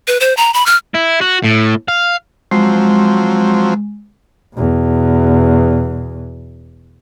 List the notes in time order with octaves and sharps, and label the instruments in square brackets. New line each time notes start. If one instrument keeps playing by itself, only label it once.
[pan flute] B4
C5
A#5
B5
F6
[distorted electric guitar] E4
F#4
A2
F5
[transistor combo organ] F3 F#3 C4 [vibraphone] G#3
[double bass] E2 B2